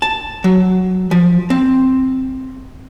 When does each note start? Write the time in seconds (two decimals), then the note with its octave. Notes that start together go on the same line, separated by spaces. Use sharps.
0.02 A5
0.44 F#3
1.11 F3
1.50 C4